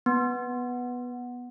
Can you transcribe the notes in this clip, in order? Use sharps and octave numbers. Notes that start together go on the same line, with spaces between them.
B3